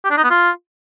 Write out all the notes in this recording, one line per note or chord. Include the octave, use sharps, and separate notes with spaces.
G4
D4
D#4
B3
F4